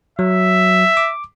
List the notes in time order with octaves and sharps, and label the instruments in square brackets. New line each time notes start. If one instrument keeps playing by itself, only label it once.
[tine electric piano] F#3 [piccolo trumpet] E5
[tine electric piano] D6